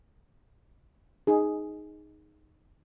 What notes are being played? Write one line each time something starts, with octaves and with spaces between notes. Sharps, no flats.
D#4 G#4